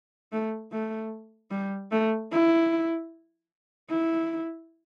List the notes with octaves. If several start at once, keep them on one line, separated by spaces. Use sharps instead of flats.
A3
A3
G3
A3
E4
E4